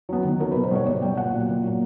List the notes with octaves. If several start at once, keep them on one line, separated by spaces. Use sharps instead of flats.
F#3 B3
D#3
F#3 B3 A#4
B2 B4
C5
G3 B3 C#5
B2 D5
G3 B3 G5
A#2 F#5
F#3 A#3
A#2
F#3 A#3